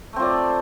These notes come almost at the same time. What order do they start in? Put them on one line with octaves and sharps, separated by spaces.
A3 C4 F4 D5